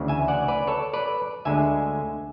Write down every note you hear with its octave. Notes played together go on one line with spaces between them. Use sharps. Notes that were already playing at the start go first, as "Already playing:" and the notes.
Already playing: D2 C#3 E3
E5 G#5
D5 F#5
B4 D5
A4 C#5
B4 D5
D2 D3 G#3 E5 G#5